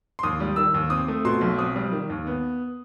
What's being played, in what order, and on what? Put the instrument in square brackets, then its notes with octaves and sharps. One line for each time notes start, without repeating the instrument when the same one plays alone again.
[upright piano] C6
D#2 D#6
G3
D#3 E6
D#2
C4 D#6
A3
B2 C6
B1
C4 D#6
G3
D#3
D#2
B3